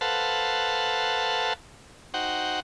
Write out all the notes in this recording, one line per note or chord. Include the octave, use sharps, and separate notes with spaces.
A4 B4 C5 F5 F#5 A5
D#4 F#4 C5 F#5 G5